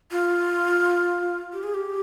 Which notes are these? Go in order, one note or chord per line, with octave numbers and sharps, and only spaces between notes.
F4
G4
G#4
G4